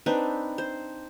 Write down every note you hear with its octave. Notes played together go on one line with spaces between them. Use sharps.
C4 D4 D#4 B4
C5